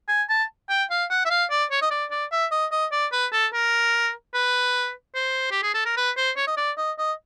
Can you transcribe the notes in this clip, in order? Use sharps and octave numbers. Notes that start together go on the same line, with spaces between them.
G#5
A5
G5
F5
F#5
E5
F5
D5
C#5
D#5
D5
D5
E5
D#5
D#5
D5
B4
A4
A#4
B4
C5
G4
G#4
A4
A#4
B4
C5
C#5
D#5
D5
D#5
D#5